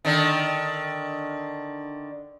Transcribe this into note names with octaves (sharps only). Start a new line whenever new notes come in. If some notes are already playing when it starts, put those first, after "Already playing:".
D3 D#3